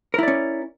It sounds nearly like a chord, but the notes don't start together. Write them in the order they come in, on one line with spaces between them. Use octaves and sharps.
A#4 E4 D5 C#4